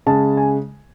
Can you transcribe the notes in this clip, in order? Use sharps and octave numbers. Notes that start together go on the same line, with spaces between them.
C#3 G#3 A5
G#5